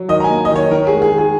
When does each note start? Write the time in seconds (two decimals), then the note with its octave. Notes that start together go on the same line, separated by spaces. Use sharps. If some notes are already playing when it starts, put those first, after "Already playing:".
Already playing: F#3
0.08 D#3 D#5
0.20 A#5
0.24 G#5
0.29 A#3
0.45 D#5
0.50 D#3
0.56 C#5
0.71 D#3 A#4
0.87 G#4
0.92 G#3
1.02 G#4
1.12 D#3
1.18 G#4